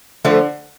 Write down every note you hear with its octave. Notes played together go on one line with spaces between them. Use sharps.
D3 F3 A3